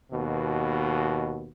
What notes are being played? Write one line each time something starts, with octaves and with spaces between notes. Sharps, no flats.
D#2 B2